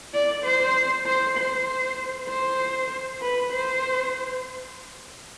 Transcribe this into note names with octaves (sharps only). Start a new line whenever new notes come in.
D5
C5
C5
C5
C5
B4
C5